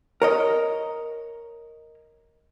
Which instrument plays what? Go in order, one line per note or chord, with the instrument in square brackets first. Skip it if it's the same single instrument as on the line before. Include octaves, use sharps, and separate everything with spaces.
[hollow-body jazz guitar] A#4 C#5 D#5